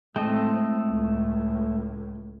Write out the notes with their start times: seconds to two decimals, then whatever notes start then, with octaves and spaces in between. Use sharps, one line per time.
0.16 A2 G#3 A3 C4 A4 D#5 G5
0.87 C#2 A2